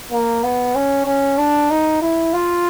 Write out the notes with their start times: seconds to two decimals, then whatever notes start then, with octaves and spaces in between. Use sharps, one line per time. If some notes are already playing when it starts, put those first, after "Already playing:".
0.12 A#3
0.43 B3
0.75 C#4
1.06 C#4
1.38 D4
1.70 D#4
2.01 E4
2.33 F4